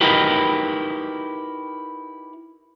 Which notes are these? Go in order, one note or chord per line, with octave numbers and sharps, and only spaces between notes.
D#4 E4 F#4 G4 A#4 B4